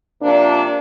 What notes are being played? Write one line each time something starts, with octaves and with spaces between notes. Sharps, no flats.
C3 F3 A#3 D4